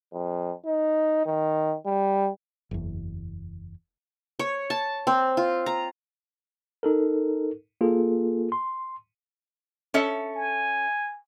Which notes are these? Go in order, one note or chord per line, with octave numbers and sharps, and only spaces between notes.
F2
D#4
D#3
G3
F#1 E2
C#5
A5
C4
F4
A#5
D#4 A4 A#4
A#3 F4 G#4 A4
C6
C#4 A4 E5
G#5